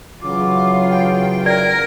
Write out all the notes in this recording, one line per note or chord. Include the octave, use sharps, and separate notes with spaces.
C#3 E3 F#3 F4 D6
G5
A#4 D5